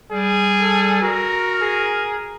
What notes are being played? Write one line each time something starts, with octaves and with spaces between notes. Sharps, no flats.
G3 G#4
A4
F#4 A#4
G#4